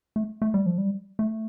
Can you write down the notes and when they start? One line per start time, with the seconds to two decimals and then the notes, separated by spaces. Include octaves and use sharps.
0.16 A3
0.42 A3
0.54 G3
0.66 F3
0.78 G3
1.19 A3